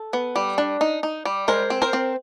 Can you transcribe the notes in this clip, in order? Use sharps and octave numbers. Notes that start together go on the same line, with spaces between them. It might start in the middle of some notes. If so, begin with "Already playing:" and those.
Already playing: A4
B3
G3
D4
D#4
D#4
G3
G#3 A#4 C5
C4
A#4 C5
C4